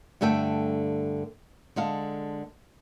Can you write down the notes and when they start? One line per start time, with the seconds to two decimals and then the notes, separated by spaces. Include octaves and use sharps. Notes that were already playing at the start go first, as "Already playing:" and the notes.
0.21 G2 D3 A3 A4 G5
1.76 D3 G#3 A4 F5